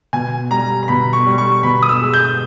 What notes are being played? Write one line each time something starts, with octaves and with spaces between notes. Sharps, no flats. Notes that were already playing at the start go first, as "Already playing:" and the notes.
B2 G#5
G3 A#5
A#5
B2 B5
C#6
G3
C#6
B2 B5
D#6
E6
G#3
G6